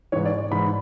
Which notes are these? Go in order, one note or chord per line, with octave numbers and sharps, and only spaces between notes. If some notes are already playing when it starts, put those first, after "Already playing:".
G#2 E3 C#5
D5
D5
G#2 E3 B5